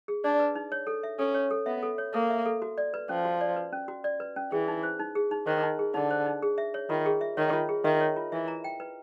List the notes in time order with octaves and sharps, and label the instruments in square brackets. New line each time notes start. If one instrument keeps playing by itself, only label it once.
[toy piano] G#4
[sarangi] D4 [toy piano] D5
[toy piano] B4
D#4
C#5
A4
E5
[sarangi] C#4 [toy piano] A4
[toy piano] C#5
A4
[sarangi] B3 [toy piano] E5
[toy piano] A4
C#5
[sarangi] A#3 [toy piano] A4
[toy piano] E5
A4
F#4
D5
B4
[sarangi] F3 [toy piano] C#4
[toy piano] F#4
D5
B4
C#4
F#4
D5
B4
C#4
[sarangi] E3 [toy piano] G#4
[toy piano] D#4
C5
D#4
G#4
D#4
[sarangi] D#3 [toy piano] C5
[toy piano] D#4
G#4
[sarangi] D3 [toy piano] D#4
[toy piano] C5
D#4
G#4
E5
C#5
[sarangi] D#3 [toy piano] F4
[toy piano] G#4
E5
[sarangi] D#3 [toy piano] C#5
[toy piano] F4
G#4
[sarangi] D#3 [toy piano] E5
[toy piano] C#5
F4
[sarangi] E3 [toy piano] E5
[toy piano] A#5
G5
B4